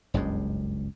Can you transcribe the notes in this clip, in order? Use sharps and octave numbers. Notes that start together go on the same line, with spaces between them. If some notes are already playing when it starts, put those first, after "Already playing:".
F#1 C#2 G2 G#3